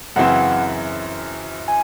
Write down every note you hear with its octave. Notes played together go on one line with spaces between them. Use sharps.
F#2 C#3 E3 C4 F#5
G#5